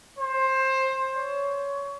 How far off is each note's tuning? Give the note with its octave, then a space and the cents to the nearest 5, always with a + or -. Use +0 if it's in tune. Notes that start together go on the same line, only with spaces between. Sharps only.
C5 +20
C#5 +20